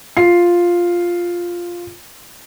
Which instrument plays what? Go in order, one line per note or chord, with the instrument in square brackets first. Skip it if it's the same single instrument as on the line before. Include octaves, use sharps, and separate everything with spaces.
[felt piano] F4 C7